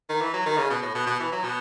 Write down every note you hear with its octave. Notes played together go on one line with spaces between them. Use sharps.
D#3
E3
F#3
D#3
C#3
B2
A2
B2
B2
E3
F#3
B2